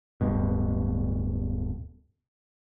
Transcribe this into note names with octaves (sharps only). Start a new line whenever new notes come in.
D1 G2 B2